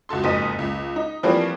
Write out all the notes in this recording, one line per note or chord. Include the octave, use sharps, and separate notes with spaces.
C#2 F#4 A4 C6
F#1 F2 G#2 D#5 B6 D#7
C#2
D#4
E3 F3 G3 A3 A#3 C4